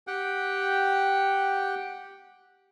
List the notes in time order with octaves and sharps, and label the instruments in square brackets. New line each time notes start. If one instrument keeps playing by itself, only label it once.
[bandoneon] G4 F#5 G5